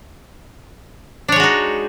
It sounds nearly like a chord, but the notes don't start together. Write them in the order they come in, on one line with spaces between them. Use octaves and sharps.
D4 C#5 G#3 F#4 D#4